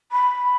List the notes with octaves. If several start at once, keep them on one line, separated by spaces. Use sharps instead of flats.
B5